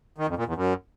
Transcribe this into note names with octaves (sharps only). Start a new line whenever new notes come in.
D#3
F2
A#2
E2
F#2